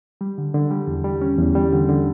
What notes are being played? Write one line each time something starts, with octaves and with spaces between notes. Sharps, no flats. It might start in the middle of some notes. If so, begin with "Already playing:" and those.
G3
D3
D3
G3
E2
G3
C#4
E2
G3
D3
D3